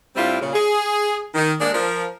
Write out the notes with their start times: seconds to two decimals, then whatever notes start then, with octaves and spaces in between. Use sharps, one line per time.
0.16 A2 G3 C4 D4 E4 F4
0.41 A#2 C#3
0.53 G#4
1.34 D#3
1.60 G#3 A#3 D4
1.74 F3 A#4